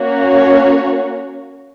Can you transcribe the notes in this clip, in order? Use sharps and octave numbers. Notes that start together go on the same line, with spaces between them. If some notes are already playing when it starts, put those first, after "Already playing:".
Already playing: A#3 C#4 F#4
C#5